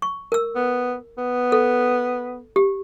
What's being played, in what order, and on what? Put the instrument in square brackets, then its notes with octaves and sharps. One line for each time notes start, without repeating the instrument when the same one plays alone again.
[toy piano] C#6
A#4 E6
[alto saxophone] B3
B3
[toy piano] A4
G4